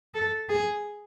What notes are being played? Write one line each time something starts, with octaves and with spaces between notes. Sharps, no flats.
A4
G#4